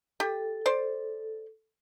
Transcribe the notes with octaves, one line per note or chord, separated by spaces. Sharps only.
G4 A4
C5 D5